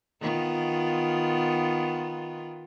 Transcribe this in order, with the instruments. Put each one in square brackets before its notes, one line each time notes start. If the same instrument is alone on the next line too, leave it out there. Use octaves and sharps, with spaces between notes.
[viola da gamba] D#3 B3 F4